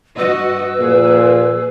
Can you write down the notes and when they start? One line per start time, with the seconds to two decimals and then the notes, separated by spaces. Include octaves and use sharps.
0.18 G2 F#4 B4 D#5 E6
0.80 A#2 F3 G#4